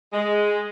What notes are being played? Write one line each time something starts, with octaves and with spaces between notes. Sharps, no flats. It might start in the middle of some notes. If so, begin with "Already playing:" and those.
G#3